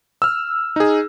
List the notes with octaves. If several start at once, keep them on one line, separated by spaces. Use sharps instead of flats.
E6 F6
D#4 G#4